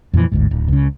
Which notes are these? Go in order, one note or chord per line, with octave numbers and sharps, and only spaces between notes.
F2 A#2 C#3 E3
G1 D2 G#2
D1
C#2 C#3